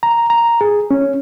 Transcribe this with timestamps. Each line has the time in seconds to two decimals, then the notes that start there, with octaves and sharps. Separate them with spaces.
0.03 A#5
0.30 A#5
0.61 G#4
0.91 C#4